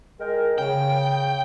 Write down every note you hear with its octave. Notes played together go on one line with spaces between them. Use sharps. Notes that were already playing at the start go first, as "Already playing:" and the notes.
G#3 A#4 G5
C#3 G5